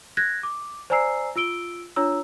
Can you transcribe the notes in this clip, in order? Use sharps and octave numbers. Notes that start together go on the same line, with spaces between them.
F#6 G#6 A#6
D6
C5 D5 G#5 A#5 E6 C7
F4 E6 D7 G7
D4 F4 C#5 A#5 E6